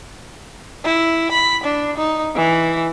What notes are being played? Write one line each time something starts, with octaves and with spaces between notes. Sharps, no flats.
E4
B5
D4
D#4
E3